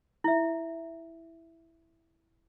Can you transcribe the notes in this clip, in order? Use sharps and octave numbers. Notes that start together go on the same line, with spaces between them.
E4 E5